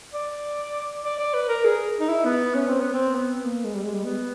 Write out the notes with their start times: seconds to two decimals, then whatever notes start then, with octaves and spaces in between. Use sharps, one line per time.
0.14 D5
1.04 D5
1.19 D5
1.34 B4
1.48 A#4
1.64 G#4
2.00 D#4
2.09 E4
2.25 B3
2.54 C#4
2.68 C4
2.80 B3
2.93 C4
3.15 B3
3.44 A#3
3.64 G#3
3.75 G3
3.84 G#3
3.95 G3
4.04 B3